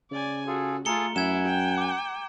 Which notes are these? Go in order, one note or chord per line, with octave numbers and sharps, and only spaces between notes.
C#3 D5 G#5
F4 F#4 G#4 A4
A3 F4 G#4 A4 A#5 C#7 G7
F#2 E4 F#5 G#5 G#6 E7
G5
D6